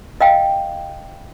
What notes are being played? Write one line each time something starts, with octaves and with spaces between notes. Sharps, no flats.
D#5 F5 G5